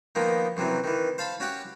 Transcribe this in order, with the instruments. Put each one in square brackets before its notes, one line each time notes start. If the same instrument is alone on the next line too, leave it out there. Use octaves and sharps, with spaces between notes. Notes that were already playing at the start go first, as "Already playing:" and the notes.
[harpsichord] D#3 F3 A#3 B3
F#2 C3 E3 F#3
D#3 E3
C5 F5 A5 B5
C#4 F#4 G4 F#5